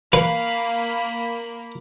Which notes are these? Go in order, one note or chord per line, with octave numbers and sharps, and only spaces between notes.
A#3 B4 F5 B5